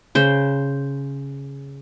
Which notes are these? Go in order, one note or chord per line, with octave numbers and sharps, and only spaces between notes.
C#3 C5